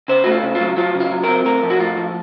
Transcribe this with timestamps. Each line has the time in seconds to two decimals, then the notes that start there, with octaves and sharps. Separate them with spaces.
0.08 C#3 C5
0.24 A3 F#4
0.31 F4
0.43 C#3
0.55 F4
0.60 F#3
0.77 F#3 F4
0.95 C#3
1.00 F4
1.11 F#3
1.24 C4 A#4
1.45 A2 A#4
1.63 F3
1.70 F#4
1.80 A2 F4
1.97 F3